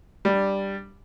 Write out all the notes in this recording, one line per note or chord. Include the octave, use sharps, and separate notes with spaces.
G3 D4